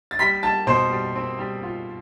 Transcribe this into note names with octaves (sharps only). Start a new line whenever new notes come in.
A6
G3 B5 B6
G3 A5 A6
B2 C5 C6
G3
C4
G3
F4